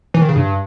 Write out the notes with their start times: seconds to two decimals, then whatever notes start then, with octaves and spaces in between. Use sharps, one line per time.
0.14 E3
0.21 D#3
0.29 C#3
0.36 G2